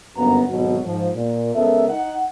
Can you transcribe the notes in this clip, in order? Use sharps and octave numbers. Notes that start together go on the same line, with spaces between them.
G1 F#2 A#3 B3 A#5
G#1 D2 B2 F#3 F#4
G#2 F3
A#2
C#2 B3 A4 A#4 E5
D#4 F#5